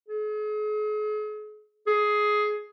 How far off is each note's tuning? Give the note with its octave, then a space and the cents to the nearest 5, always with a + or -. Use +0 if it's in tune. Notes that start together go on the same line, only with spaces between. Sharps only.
G#4 +40
G#4 +15